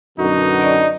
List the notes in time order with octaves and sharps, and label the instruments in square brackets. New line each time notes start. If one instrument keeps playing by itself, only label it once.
[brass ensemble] F#2 B2 D3 [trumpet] D#4 [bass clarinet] F#4
[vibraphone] D5 D#5